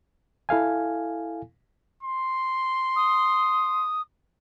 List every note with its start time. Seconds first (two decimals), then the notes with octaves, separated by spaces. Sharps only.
0.49 E4 A4 F5 G#5
2.03 C6
2.96 D#6